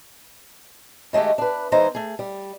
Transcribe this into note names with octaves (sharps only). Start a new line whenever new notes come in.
D#3 G#3 A3 F#4 G4
D4 B4
E2 E3 G#3 D#4 C5 A#5
A3 G#4
G3